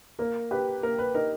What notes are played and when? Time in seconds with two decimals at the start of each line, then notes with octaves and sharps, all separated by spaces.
0.19 A#3 A#4
0.51 G4 B4
0.83 A#3 A#4
0.99 B4
1.14 D#4 A#4